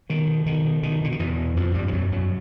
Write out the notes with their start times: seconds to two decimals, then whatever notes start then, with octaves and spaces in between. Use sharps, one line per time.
0.10 B2 D#3
0.27 B2
0.46 B2 D#3
0.65 B2
0.83 B2 D#3
1.01 B2 D3
1.12 D#3
1.19 E2 B2 E3
1.38 B2
1.57 F2 B2 F3
1.74 G2 B2 G3
1.88 F3
1.93 F#2 B2 F#3
2.11 F#2 B2 F#3